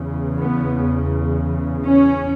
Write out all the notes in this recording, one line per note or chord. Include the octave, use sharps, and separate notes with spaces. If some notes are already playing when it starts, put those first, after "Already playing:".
Already playing: E2 C#3
B3
C#4